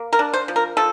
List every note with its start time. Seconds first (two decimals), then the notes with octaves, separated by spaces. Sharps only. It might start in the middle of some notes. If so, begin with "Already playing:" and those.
Already playing: A#3
0.13 A#4
0.19 D4
0.34 C5
0.48 F3
0.56 A#4
0.77 F3 A4